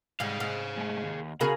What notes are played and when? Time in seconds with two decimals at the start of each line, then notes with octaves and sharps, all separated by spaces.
0.20 G#2 G3 G#4 F5
0.40 G#2 F6
0.77 G#3 A3
1.03 D#2
1.41 C#3 C#4 F#4 G#4 A#4 B5